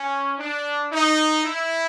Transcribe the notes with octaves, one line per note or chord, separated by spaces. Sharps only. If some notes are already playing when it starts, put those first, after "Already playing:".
Already playing: C#4
D4
D#4
E4